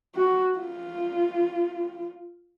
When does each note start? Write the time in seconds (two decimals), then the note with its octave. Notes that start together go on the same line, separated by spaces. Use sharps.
0.16 F#4
0.59 F4